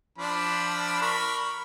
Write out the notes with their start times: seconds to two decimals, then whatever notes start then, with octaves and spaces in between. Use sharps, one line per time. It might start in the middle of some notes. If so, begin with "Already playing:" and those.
0.18 F3 D4 B5
1.01 A#4 B5 C#6